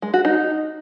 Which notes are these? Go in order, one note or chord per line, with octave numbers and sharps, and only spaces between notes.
G#3
F#4
D#4